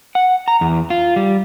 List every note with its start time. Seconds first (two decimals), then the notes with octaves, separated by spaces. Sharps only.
0.15 F#5
0.48 A#5
0.61 E2
0.90 F4
1.16 G3